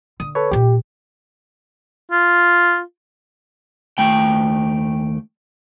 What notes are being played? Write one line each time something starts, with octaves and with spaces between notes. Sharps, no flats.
D3 D#6
A4 B4 C#5
A#2 D#4 G4
F4
D#2 A3 G5